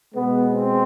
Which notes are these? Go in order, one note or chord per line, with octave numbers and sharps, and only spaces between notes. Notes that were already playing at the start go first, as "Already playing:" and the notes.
B2 G#3 B3
C4